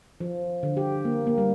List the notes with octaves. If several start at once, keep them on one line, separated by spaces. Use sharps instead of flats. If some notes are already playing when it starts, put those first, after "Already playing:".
F3
D3
G4
A#3
A#3
G3